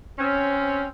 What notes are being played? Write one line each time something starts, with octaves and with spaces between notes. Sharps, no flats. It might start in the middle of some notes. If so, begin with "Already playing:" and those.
C4 C#4